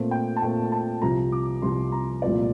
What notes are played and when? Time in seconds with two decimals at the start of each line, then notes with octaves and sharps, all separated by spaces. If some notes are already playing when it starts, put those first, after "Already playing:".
Already playing: A#2 A3 C4
0.11 G5
0.36 A5
0.42 A#2 A3 C4 G5
0.72 A5
1.02 C2 C3 F3 A#5
1.32 D6
1.62 C2 C3 F3 C6
1.92 A#5
2.22 C2 A#2 F3 A3 C4 D5